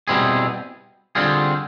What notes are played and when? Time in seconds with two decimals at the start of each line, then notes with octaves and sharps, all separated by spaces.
0.08 B2 G3 C4 E4 G#4
1.15 D3 G3 C4 F4 G#4